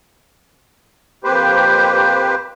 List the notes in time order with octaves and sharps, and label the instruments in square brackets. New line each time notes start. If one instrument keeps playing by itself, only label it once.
[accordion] F2 A#3 G4 B4 C5